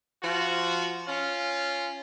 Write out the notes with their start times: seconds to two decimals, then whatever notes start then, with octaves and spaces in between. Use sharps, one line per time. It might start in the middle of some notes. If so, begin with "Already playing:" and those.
0.22 F3 F#4
1.07 C#4 F4